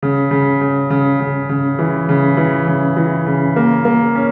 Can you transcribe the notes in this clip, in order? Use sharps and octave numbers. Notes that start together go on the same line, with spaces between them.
C#3
C#3
C#3
C#3
C#3
C#3
E3
C#3
E3
C#3
E3
C#3
A#3
A#3
C#4